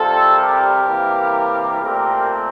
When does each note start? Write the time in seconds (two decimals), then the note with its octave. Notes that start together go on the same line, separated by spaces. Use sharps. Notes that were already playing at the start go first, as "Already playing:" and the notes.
Already playing: C3 G3 C4 F4 A4
0.38 G4 A#4
0.85 C3 E3 G3 A#3
1.81 A#2 A3 C4 G4 A#4